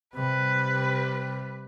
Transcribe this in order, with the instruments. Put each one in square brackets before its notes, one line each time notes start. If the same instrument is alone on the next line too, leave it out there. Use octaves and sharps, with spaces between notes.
[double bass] C3 G3 [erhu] B4